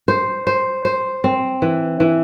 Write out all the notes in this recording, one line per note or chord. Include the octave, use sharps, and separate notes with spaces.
C5
C5
C5
C4
E3
E3